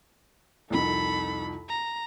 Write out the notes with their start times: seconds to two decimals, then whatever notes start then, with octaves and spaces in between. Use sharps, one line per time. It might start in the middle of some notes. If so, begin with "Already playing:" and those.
0.70 C2 F2 D#3 A4 B5
1.69 A#5